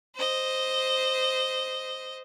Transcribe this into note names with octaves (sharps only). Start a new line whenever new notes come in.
C5 D#5